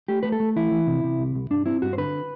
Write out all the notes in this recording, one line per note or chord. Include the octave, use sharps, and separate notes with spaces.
A3 G4
A3 B4
A4
A3
E3 E4
E3
C3
C3
C2
C2
G2 D4
C4 E4
G2 F#4
C5
D3 B4